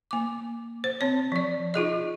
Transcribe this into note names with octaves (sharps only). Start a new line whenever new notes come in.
A#3 D6
C5
C4 C#5
F3 D5
D#4 F4 G#4 D#5